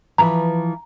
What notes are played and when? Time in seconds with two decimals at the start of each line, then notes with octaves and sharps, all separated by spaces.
0.18 E3 F3 B4 A#5